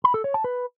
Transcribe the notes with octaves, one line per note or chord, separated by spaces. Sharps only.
B5
A4
C#5
A5
B4